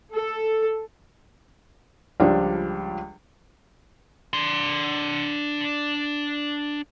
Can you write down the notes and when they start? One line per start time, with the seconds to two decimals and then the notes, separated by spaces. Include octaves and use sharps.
0.13 A4
2.20 C#2 F3 G3 D4
4.33 D4 C6